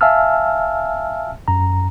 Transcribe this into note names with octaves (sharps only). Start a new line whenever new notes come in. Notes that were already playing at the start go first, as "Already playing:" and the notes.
E5 F5 G#5 A5 E6 F6
F#2 A#5